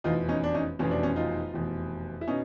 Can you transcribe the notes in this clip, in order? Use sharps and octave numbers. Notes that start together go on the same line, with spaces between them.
F1 E2 B2 D#4 F4
C#4 D#4
D4
C#4 D#4
F1 E2 B2 C#4
D4
C#4
D#4 F4
F1 E2 B2
E4
B2 C#4 D#4